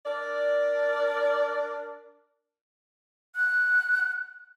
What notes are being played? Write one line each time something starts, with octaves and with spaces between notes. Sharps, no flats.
D4 A#4 D5
F#6